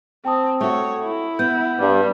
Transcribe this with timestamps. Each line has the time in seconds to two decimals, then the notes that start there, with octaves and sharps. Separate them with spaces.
0.25 C4 G5 A5 D#6
0.61 A3 F#4 C#5
1.01 E4
1.39 B3 G6
1.79 G2 G3 D4